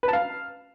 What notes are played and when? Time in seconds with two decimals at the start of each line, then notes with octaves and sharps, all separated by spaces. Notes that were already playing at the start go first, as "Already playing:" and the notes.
0.03 B4
0.08 A5
0.13 F5